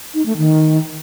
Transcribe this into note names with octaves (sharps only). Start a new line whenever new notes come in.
D#4
A3
D#3